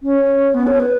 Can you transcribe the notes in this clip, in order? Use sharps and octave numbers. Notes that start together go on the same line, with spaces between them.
C#4
B3
C#5
B4